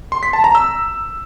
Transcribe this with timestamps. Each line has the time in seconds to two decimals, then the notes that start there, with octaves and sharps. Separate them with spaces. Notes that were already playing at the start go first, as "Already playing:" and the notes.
0.12 C6
0.23 B6
0.33 A5
0.44 A#5
0.55 E6